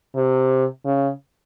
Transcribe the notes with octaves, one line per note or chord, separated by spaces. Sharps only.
C3
C#3